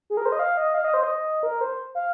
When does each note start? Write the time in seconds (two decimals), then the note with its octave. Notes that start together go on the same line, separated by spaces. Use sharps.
0.10 G#4
0.17 A#4
0.26 C5
0.32 D#5
0.39 F5
0.57 D#5
0.74 F5
0.84 D#5
0.94 C5
1.03 D#5
1.43 A#4
1.61 C5
1.95 F5